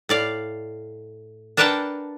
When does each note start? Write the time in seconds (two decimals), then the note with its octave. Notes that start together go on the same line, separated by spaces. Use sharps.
0.09 A2 D5 F5
1.57 D4 A#4 B4 F#5 G5 A5